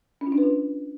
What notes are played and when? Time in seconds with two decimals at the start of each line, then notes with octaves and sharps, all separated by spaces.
0.21 C#4
0.27 F4
0.32 D4
0.38 B4
0.43 F4